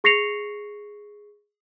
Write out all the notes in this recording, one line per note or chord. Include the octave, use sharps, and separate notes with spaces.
G#4 C#6 A#6 C7 C#7 F7